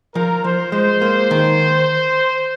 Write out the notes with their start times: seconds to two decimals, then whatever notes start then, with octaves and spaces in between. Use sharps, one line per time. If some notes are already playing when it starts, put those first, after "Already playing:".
0.14 F3 A#4
0.44 F3 C5
0.72 G#3 C5
1.02 A#3
1.31 D#3